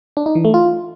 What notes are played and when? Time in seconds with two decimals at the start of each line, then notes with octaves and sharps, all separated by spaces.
0.17 D4
0.26 D#4
0.35 E3
0.45 A3
0.54 F4